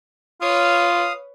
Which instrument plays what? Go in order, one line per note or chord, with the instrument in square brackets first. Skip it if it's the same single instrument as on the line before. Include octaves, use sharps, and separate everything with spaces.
[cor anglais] F4 [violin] B4 C#5 [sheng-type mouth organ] F5 D#6